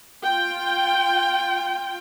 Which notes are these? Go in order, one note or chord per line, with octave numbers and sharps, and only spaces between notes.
F4 G5